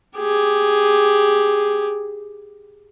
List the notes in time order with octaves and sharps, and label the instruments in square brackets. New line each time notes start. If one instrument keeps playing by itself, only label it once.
[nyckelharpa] G4 G#4